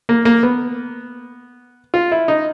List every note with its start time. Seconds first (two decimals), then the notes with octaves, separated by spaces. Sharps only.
0.09 A#3
0.25 A#3
0.43 B3
1.94 F4
2.12 E4
2.28 D#4